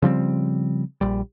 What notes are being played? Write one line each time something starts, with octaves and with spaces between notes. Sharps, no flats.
C#3 F3 G3 C4
A#1 G3